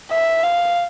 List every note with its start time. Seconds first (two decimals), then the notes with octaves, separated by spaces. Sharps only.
0.11 E5
0.43 F5